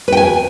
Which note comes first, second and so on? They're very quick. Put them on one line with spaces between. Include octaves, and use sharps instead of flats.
B4 G5 G#5